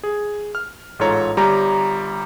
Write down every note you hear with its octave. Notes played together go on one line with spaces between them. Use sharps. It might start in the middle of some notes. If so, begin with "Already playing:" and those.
G#4
F6
A1 G#2 F4 A4 C#5 A#5
G1 G3 G4 C#5 A#5